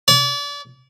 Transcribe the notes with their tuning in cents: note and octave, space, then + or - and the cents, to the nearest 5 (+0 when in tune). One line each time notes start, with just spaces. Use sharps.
D5 -35